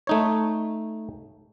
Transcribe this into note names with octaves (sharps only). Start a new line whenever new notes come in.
A3 D#4 C#5